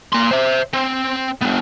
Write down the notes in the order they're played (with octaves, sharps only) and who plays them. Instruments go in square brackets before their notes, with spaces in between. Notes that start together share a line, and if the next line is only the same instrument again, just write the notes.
[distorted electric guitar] A#3 C6
C5 E5
C4
B3 D4